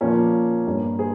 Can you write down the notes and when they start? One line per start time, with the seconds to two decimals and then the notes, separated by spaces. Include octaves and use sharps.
0.01 A#2 F3 A#3 C#4
0.67 G2 G3 A#3
0.99 G#4 C5